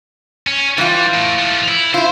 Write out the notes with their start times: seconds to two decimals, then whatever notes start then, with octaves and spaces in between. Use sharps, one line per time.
0.47 C#4
0.78 E3 G3 F4
1.14 A2
1.39 F3 A3
1.68 E4
1.94 E4 F4 C5